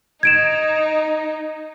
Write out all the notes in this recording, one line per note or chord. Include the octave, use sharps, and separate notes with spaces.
D#4 G#6 D7 E7